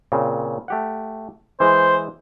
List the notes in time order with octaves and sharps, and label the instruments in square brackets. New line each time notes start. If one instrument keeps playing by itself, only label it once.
[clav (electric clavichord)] A#2 C#3 C4
A3 G4 F#5
[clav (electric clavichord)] E3 G#3 [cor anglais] C5